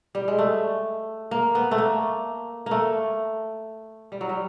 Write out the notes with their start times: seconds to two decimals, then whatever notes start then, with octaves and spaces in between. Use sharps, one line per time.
0.15 G3
0.28 G#3
0.38 A3
1.31 A#3
1.55 B3
1.71 A3
1.78 A#3
2.66 A3 A#3
4.12 G3
4.21 F#3
4.29 G3